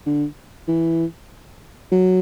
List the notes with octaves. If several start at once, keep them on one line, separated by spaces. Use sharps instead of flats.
D3
E3
F#3